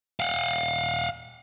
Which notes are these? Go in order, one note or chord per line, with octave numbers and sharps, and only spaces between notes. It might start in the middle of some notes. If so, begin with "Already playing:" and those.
F5 F#5